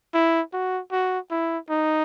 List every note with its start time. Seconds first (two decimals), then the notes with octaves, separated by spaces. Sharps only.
0.14 E4
0.53 F#4
0.92 F#4
1.31 E4
1.70 D#4